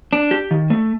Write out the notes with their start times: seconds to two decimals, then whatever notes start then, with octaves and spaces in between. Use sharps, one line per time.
0.13 D4
0.31 G4
0.51 D#3
0.70 A3